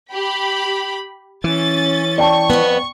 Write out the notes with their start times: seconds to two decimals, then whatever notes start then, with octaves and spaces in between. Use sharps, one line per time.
0.12 G4 B5
1.44 E3 C#4 A6
2.18 D5 G5 A5 C#6
2.50 F2 B3